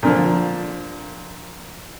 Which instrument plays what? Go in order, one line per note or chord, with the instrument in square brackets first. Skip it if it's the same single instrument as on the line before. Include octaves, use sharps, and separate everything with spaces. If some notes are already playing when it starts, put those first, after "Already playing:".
[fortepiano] A#2 D3 F3